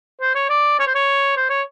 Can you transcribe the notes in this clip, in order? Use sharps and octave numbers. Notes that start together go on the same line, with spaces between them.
C5
C#5
D5
C#5
C5
C#5
C5
C#5